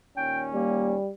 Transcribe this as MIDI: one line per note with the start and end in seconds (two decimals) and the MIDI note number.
0.17 0.95 39
0.17 0.95 46
0.17 0.95 61
0.17 0.43 79
0.53 1.11 55
0.53 0.93 58